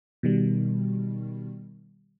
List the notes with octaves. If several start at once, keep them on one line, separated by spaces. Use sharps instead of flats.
B2 D#3 G3